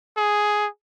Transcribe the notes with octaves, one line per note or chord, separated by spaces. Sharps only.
G#4